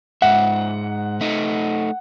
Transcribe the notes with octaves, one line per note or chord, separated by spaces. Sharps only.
G#2 E5 F#5
A3 D#4